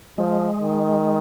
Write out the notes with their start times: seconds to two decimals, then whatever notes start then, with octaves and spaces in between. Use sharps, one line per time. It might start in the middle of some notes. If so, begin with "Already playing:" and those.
0.18 F3 G#3
0.61 D#3